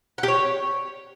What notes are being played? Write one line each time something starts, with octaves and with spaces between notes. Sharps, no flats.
F#5
G4
C#5